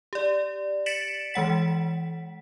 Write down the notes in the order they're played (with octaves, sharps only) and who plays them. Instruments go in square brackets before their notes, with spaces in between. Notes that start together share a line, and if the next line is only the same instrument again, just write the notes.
[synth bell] G4 D5
A6 B6 C#7 D7 E7 F#7
E3 G#3 F#5 B6